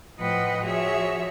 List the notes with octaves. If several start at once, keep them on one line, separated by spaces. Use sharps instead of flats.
A2 F3 B4 D#5 F#5 G5
F3 F#4 G#4 C#5 E5